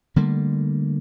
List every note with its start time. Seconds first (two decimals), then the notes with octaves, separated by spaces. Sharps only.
0.16 D3 G3 A3 A#3